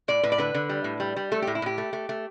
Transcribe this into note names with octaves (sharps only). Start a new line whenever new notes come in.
A2 D5
A2 B4
D5
D3 B4
D3
G3
A2
G3
G3
A3 A4
G4
A2
E4
A2 G4
A3
A3
A3